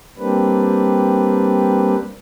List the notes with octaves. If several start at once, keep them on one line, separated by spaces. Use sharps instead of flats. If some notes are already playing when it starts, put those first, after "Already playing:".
G3 A#3 C4 D4 B4